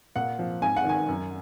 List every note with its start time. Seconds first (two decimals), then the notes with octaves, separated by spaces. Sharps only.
0.16 A#2 F#5
0.39 F3
0.62 G#2 G#5
0.77 F#5
0.85 D#3 G#5
1.08 F#2